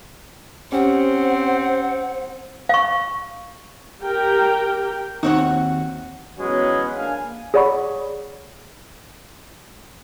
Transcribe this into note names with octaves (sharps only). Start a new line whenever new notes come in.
C4 C#4 G4 C5 F#5
F5 C#6
G4 A#4 G5
D#2 C4 D#4 F#4 C#5
E2 F#3 G#3 B3 C#4
A#3 D4 F5 G#5
G#4 C#5 D5 F#5 B5 C#6